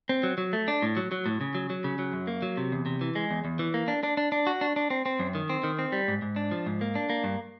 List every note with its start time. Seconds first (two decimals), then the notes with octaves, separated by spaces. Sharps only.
0.09 C4
0.23 F#3
0.38 F#3
0.53 A3
0.68 D4
0.82 A2
0.97 F#3
1.12 F#3
1.26 A2
1.41 C#3
1.55 F#3
1.70 F#3
1.84 C#3
1.99 F#3
2.13 F#2
2.27 A#3
2.42 F#3
2.57 C3
2.72 E2
2.86 C3
3.01 E3
3.15 G#3
3.31 E2
3.45 E2
3.59 E3
3.74 A#3
3.88 D4
4.03 D4
4.17 D4
4.32 D4
4.47 F#4
4.61 D4
4.76 D4
4.90 C4
5.06 C4
5.19 F#2
5.35 D#3
5.49 C4
5.64 D#3
5.79 C4
5.92 G3
6.08 G#2
6.22 G#2
6.36 D4
6.51 F3
6.66 G#2
6.81 A#3
6.95 D4
7.10 A#3
7.24 G2